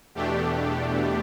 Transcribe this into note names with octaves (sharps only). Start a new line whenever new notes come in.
E2 B2 A3 D4 G4